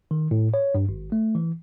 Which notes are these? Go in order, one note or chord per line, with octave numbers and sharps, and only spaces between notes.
D#3
A2
C#5
G2
G#1
A3
E3